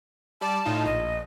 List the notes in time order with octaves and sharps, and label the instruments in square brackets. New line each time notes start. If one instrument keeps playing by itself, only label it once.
[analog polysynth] G3 D5 [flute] A5
[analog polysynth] A2 D#4 F4
[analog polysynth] A#1 [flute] D#5